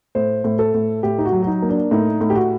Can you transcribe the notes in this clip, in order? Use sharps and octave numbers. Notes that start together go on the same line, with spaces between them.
A2 C5
A2
A4
A2
A2 G4
D#4
F#4
F#3
F#4
D#4
A#3
D4
A2 D#4
A2
G4
F#4